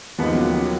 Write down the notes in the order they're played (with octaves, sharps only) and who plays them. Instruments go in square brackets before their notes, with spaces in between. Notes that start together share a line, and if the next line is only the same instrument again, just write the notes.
[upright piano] D#2 D#3 G#3 B3 D#4 [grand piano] F3
[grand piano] F#3
F#3